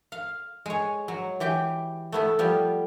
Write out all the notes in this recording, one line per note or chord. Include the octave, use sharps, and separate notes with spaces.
F5
G#3 C#5
F#3
E3 G4 G5
A3 B3 E4
F3 G3 B3